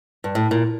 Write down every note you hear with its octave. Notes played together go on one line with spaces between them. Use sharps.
G2
A2
A#2